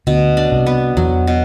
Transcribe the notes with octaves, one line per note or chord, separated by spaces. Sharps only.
D2 B2 D3
D4
C2 C3
B3
E2 E3 F#3
B2